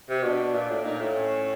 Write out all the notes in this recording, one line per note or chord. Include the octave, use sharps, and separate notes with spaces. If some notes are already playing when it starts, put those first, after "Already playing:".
C3
B2 D4
A#2
A2
A#2 D#4
A2
C#4